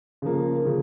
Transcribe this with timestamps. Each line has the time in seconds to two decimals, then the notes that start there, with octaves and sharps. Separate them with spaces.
0.22 C#3 F3 A#3
0.63 C#3 F3 A#3